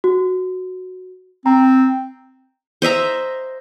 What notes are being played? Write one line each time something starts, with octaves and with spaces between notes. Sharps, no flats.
F#4
C4 A#5
C5 D#5 E5 A#5